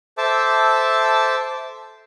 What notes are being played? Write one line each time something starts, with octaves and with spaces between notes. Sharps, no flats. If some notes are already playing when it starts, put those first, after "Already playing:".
A4 C5 E5 A5 D6 E6